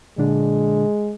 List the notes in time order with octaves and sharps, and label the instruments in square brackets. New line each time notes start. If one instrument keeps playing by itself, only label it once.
[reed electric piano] A#2 D3 D4 [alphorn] G#3